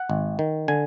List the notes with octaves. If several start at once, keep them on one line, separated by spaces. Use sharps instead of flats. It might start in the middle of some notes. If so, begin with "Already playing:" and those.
Already playing: F#5
G#1
D#3
D3 G#5